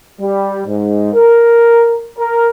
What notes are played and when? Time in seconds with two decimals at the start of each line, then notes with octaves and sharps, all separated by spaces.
0.20 G3
0.66 G#2
1.13 A#4
2.18 A#4